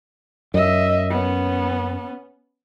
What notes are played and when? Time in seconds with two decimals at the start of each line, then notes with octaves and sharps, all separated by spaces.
0.54 F#2 D#5 E5
1.10 B3 C#4